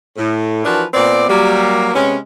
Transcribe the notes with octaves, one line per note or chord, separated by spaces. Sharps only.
A2
E3 F3 D4 F#4 A#4 B4
A#2 B3 C4 D5
F#3 G3 A#3
C3 G#3 B3 C#4